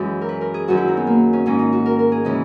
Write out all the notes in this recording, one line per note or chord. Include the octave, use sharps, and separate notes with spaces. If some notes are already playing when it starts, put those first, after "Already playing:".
Already playing: F#2 E3 G#3
A#4
B4
A#4
G#4
F#2 D#3 F#3 F#4
E4
D#4
B3
A#3
C#4
G#2 D#3 G#3 C#4
D#4
F#4
A#4
A#4
G#4
C#3 E3 G#3